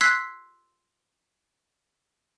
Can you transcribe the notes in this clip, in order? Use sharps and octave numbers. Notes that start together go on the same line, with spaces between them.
C6 E6 F#6 G#6 B6 C7